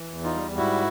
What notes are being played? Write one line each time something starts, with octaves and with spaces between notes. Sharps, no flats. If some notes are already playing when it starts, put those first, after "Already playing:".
Already playing: E3
E2
D#4 F4
G3
G#2 E4 F#4